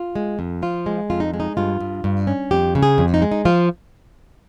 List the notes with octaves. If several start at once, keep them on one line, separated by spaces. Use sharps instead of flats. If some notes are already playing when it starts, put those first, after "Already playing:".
Already playing: F4
G#3
F2
F3 F4
G#3
F2 F4
D#4
G#3
D#4
G2 F4
G2
G2
C#4
F2 G4
C#3
G#4
F2
D#4
G#3
D#4
F3 F4